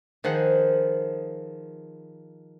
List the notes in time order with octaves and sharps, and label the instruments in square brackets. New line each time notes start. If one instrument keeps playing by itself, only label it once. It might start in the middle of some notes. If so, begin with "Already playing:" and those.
[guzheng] D#3 F3 G#4 F#5